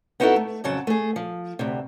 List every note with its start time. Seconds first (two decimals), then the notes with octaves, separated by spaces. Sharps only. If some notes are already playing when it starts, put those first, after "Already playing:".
0.20 B3 D#4 E4 F#4 G4 A4
0.36 A3
0.64 F2 C#3 F#3 A5
0.87 A3 G#4
1.16 F3
1.59 D2 C3